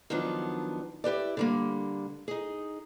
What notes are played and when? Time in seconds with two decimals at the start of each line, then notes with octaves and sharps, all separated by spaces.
0.10 D#3 F3 F#3 B3 D4
1.04 E4 G4 B4 D5
1.37 D3 G3 A#3
2.28 D#4 G#4